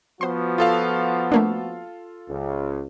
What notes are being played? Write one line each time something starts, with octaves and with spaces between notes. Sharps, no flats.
F3 B3 F#4 C5 C6
F4 A4 F5
A3 A#3 D4
C#2